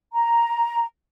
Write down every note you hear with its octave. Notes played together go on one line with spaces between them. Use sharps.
A#5